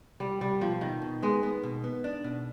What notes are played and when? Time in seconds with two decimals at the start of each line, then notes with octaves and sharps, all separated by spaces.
0.20 C2 G3
0.41 C2 G3
0.61 B2 F3
0.81 B2 D#3
1.02 B2
1.22 G#3 B3
1.43 B3
1.63 B2
1.84 B3
2.04 D4
2.24 B2